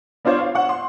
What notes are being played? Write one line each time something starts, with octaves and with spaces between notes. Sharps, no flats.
B3 D4 F4 C5 C#5
F5
F#5 C#6
C6